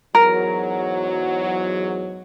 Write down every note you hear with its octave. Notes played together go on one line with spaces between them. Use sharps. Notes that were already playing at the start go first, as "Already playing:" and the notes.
E2 G#2 F#3 A#4